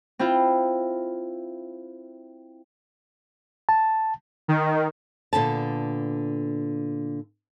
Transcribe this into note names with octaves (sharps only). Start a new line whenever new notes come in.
C4 E4 F4
A5
D#3
A#2 D3 B3 A5